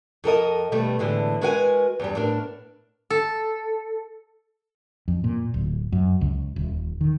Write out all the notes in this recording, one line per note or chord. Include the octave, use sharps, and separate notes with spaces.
F2 A4 A#4 D#5
B2 D#3 G3 A3
A2 D3 E3 G#3
G#3 F#4 A#4 B4 F#5 G#5
E2 G2 G3
A2 D4 A#4
A4
F2
A#2
D1
F#2
C#2
D#1
D#3